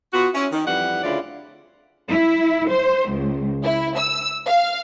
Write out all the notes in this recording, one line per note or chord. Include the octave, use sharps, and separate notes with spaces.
B3 F4 F#4
C#4 E4
D#3
F2 E3 G3 F#5
D2 C#3 E4 F4 D5
E4
C5
C#2
E4
E6
F5